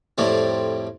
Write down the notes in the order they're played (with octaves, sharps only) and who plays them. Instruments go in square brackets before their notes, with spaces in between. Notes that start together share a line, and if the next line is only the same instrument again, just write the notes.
[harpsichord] F2 A2 G3 C4